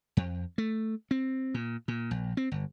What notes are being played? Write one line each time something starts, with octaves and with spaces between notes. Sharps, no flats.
F2
A3
C4
A#2
A#2
A#1
C4
G1